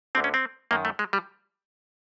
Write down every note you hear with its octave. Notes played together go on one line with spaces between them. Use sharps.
D2 D3 C4
C#4
C4
F#2 D#3 A#3
A3
G#3
G3